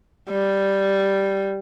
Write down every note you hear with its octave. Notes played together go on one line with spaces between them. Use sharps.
G3